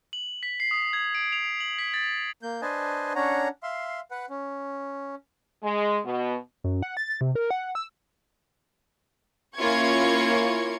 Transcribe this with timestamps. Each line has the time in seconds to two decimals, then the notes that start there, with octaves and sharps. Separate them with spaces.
0.13 F#7
0.43 B6
0.60 C7
0.71 D#6
0.93 G#6
1.15 D7
1.32 F7
1.60 F#7
1.79 B6
1.94 A6
2.43 A#3 G6
2.62 D4 B4 C5 D#5 G#5 A5
3.15 C#4 D4 C#5 F#5 A#5
3.63 E5 F5 C6
4.11 B4 F#5
4.30 C#4
5.63 G#3
6.05 B2
6.64 F#2
6.83 F#5
6.97 A6
7.21 C3
7.35 A#4
7.51 F#5
7.75 E6
9.58 A#3 C#4 E4 F4 C#6 G#6